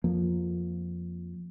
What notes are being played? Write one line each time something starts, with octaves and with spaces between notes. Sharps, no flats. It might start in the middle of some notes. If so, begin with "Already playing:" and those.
F2 F3 A#3